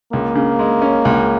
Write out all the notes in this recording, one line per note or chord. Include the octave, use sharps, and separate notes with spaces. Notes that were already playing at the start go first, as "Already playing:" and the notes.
C#2 A#3
C#3
G#3
C#4
C#2